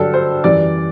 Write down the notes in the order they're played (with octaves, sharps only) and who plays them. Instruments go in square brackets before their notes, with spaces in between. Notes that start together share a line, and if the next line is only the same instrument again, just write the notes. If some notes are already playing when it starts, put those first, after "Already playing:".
Already playing: [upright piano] G2 D3 F#3 A4
C5
F#2 E3 G3 D5